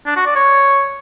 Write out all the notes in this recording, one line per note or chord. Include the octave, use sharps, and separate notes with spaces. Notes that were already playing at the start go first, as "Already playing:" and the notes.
D4
F#4
D5
C#5